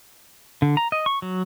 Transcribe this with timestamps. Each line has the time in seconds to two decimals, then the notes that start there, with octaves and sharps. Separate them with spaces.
0.62 D3
0.77 A#5
0.92 D#5
1.06 C#6
1.22 F#3